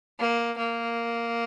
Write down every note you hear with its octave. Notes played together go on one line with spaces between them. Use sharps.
A#3
A#3